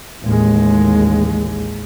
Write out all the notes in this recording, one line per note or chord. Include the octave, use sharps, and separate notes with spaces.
A1 D#2 G#3